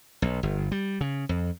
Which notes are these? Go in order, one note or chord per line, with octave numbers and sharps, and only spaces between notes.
B1
G1
G3
C#3
F2